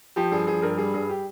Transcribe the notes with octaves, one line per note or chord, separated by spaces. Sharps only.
F3 G4
G2 G#4
F3 G#4
G2 A#4
G3 G#4
G2 G#4
G4